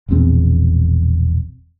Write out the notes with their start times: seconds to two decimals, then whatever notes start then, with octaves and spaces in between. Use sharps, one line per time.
0.08 E1 A#1 E2 C4